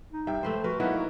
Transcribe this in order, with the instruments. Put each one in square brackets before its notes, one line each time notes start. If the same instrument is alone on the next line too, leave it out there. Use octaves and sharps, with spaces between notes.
[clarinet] D#4
[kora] G2 [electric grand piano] E5 G5
[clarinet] F3 [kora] A3 B4 C5
[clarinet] F#4 [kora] A#4 [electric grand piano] B4
[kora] F#3 A#3 [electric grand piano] B3 D#4 E4 [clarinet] B4
[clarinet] F#4